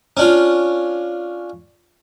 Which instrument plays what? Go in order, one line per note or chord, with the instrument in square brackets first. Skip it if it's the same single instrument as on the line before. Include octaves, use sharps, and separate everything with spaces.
[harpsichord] C#4 D4 F4